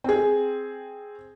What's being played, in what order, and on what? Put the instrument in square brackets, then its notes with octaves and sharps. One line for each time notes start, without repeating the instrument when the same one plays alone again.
[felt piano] C4 G#4